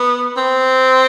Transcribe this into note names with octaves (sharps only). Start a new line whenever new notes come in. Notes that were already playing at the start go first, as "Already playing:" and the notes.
Already playing: B3
C4